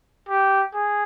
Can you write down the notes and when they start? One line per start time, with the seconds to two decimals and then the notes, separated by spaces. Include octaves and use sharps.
0.29 G4
0.74 G#4